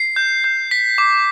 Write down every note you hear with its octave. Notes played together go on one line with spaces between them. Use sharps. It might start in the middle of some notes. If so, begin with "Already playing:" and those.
Already playing: C7
G6
G6
B6
D6